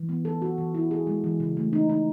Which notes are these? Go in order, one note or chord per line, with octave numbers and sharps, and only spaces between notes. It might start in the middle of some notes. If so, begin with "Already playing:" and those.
Already playing: E3
B3
A4
F#4
E3
E4
G#4
G#3
E3
C#3
A3
D#4
D#4